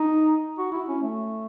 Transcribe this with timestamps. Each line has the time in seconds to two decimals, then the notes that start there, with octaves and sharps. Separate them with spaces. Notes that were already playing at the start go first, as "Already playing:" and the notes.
Already playing: D#4
0.58 F#4
0.72 E4
0.88 C#4
1.02 A3